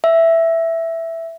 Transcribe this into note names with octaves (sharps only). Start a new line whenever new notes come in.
E5